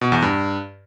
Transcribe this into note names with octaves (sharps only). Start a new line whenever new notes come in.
B2
E2
G2